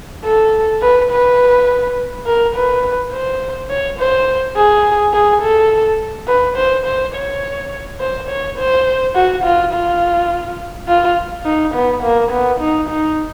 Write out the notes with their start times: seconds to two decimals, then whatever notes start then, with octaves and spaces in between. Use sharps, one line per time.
0.25 A4
0.82 B4
1.11 B4
2.26 A#4
2.55 B4
3.12 C5
3.70 C#5
3.99 C5
4.56 G#4
5.13 G#4
5.42 A4
6.28 B4
6.57 C5
6.86 C5
7.14 C#5
8.00 C5
8.29 C#5
8.58 C5
9.15 F#4
9.44 F4
9.73 F4
10.88 F4
11.45 D#4
11.74 B3
12.03 A#3
12.31 B3
12.60 D#4
12.89 D#4